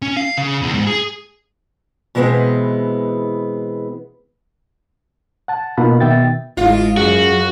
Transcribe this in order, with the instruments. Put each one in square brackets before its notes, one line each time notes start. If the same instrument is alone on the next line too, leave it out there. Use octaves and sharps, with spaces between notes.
[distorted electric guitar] C#4
F5
C#3
E2
G#2
G#4
[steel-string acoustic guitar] B2 E3 G#3 B3 C4
[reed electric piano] F#5 A5
B2 A#3 D#4 F4 F#5 B5
B2 D#3 B3 E5 G5 A6
[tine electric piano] G1 E4 [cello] G#2 G#3 [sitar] F4
[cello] F#2 [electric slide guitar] F#4 [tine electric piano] G#4